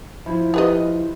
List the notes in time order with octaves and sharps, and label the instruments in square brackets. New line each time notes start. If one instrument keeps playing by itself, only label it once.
[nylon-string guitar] F3 [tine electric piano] E4
[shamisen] G4 B4 D#5